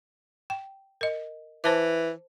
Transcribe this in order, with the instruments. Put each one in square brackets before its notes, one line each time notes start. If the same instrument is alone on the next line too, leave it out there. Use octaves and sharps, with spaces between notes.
[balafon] G5
A#4 D#5
[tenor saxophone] E3 [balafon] C5 A5 D6